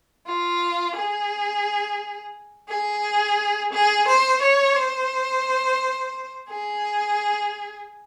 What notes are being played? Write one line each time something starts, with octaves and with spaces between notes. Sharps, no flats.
F4
G#4
G#4
G#4
C5
C#5
C5
G#4